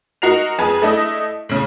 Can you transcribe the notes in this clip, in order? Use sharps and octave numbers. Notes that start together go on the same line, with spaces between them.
D#4 F#4 A#4 C7 F7
F2 G#4 B4 A5
A3 D4 E4 A4 D#5 E5
A2 C#3